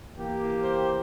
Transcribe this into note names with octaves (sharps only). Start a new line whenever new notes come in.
E3 A#3 G4
C5